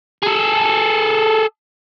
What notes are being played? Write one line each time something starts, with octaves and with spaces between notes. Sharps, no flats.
G#4 A4